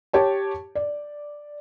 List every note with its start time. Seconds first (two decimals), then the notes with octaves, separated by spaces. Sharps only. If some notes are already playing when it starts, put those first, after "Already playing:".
0.13 G4 C#5 A5
0.75 D5